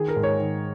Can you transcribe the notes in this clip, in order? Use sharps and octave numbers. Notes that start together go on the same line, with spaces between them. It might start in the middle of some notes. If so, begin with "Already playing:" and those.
Already playing: D#3 G#4
A#4
G#2
C#5
D#3